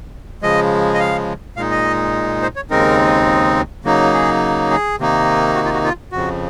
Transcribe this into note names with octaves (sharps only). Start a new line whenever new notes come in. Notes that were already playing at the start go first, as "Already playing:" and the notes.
C#3 F3 G#3 D#5
D#5
F5
A#2 G#3 D#4 F5
D#5
C5
C#5
D#2 C#3 G#3 C4 D#4 A#4
C#3 F#3 A#3 D#4
G#4
G#4
C3 D#3 A#3 D#4
F#4
F4
F#4
F4
F2 C#3 F3 F#4